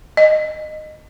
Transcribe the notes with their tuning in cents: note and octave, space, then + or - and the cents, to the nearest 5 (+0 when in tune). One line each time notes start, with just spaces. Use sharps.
D#5 -15